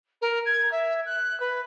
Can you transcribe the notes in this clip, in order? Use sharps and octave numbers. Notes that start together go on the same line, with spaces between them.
A#4
G#6
E5
F#6
B4